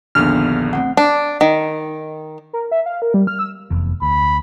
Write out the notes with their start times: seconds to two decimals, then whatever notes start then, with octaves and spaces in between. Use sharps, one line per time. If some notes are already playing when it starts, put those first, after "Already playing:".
0.15 A#1 D#2 D3 B3 D4 F6
0.73 A3 C4 F#5
0.97 D4
1.41 D#3
2.53 A#4
2.71 E5
2.86 F5
3.02 A#4
3.14 G3
3.27 F6
3.39 E6
3.70 F1 E2
4.02 D2 B5